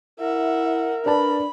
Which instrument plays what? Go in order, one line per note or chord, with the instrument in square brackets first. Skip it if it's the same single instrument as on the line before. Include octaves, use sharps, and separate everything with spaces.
[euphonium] E4 [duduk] A#4 [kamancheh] E5 F#5
[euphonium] D4 [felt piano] B4 D5 A5 [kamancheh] B5